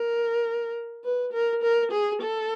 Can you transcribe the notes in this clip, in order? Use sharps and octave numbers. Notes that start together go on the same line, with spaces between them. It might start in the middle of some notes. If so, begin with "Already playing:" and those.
Already playing: A#4
B4
A#4
A#4
G#4
A4